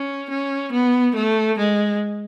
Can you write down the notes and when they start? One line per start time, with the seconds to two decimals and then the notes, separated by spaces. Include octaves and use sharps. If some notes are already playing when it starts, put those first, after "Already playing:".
Already playing: C#4
0.30 C#4
0.72 B3
1.15 A3
1.58 G#3